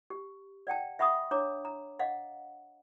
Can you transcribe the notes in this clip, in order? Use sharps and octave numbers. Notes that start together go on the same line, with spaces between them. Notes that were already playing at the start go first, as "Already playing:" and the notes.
G4
D5 F#5 G5 A5
E5 F#5 B5 C#6 D#6
D4 C#5 A#5 D6
A#5
D#5 F5 F#5